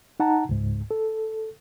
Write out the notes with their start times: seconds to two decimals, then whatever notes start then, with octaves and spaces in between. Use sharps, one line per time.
0.20 D#4 F#5 A5 A#5
0.49 C#2 G#2
0.91 A4